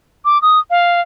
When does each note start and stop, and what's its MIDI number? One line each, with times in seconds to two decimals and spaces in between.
0.25 0.40 86
0.42 0.59 87
0.70 1.00 77